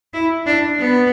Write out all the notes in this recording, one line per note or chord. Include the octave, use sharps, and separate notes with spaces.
E4
D4
B3